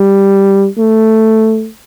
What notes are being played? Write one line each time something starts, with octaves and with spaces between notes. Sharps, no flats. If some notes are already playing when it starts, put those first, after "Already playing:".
Already playing: G3
A3